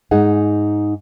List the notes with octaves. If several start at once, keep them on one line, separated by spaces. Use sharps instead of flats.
G#2 D#4 G#4 F#5